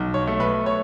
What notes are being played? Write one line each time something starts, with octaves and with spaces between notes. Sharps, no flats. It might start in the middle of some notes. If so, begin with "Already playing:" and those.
Already playing: B1
C#5
A3
B4
C#5